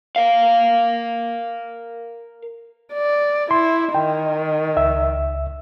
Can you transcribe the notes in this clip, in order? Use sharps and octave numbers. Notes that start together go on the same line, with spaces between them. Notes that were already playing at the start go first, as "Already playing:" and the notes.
A#4 F5
D5
E4 C6
D#3 G5
C#2 E5 E6